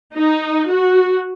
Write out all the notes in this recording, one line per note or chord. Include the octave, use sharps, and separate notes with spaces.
D#4
F#4